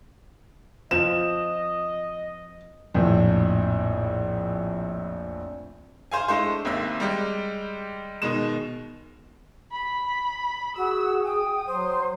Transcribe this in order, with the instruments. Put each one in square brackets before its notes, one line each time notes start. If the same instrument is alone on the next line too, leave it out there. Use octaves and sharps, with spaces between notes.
[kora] F3 C4 [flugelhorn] D#5 [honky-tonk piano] E7
[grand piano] A#1 F2 A2
[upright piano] C5 F5 G#5
G#3 A3 D4 E4 C5
G#1 D#2 C4 E5 E6
G3 G#3 G4
B2 D#3 G#3 E7
[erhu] B5
[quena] F#4 [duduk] G#4 [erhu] E6
[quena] G5 [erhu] D#6
[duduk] F#3 [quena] C5